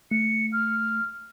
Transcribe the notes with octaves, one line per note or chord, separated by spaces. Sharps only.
A3 C#7
F6